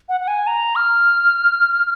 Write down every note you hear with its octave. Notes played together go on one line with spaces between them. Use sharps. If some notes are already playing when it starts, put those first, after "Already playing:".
F#5
F#5
G#5
A#5
F6